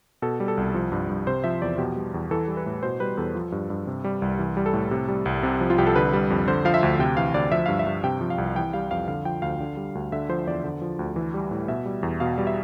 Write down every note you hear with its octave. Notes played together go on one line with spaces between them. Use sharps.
B2 A4
G3
A4
C2
F3
G2
G2
C3 C5
F3 E5
E2 D5
B2 G4
G3
E2
E3 A4
G3
B4
A2
B2 C5
G3 B4
E2 A4
F3
G2
G2
C3
G3
C2
E3
G3
A4
A2
C3
G3
C2
C3
F3
F4
C2 G4
A4
D3 B4
G3
F2
D3 C5
F3 F5
E5
D2
C3 G5
E3 F5
D2 D5
F3 E5
G2 F5
E5
G2
C3 G5
F3
F5
C2
E3 G5
G3 F5
F2 F5
D3 F5
F3 G5
D2 F5
D3
G3
D2
D3 E5
F3 C5
E2 D5
D3
F3
D2
E3
G3
A2
B2 E5
G3
E2
B2 F5
G3
E5